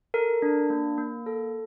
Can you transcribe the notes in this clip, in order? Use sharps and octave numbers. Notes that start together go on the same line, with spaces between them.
A4 A#4
D4
A#3
A#3
A4